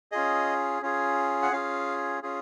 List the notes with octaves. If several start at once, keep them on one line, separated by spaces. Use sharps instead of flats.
C#4 F4 G#4 D#5
C#4 F4 G#4
F#5
C#4 F4 G#4 F5
C#4 F4 G#4